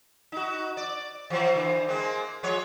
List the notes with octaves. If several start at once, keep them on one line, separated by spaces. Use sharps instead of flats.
D#4 F#4
D5
E3 F#3 C4
D3 E3 C4
G#3 A#3 C4
F3 G#3 C#5